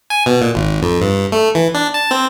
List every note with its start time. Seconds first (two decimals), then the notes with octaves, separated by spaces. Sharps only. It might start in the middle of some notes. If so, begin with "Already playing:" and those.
0.10 G#5
0.26 B2
0.42 A#2
0.55 G#1
0.82 F2
1.01 G2
1.32 A3
1.55 E3
1.75 D4
1.94 A5
2.11 C4